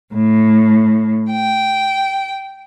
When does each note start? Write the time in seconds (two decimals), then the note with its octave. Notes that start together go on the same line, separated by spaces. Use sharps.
0.13 A2
1.31 G5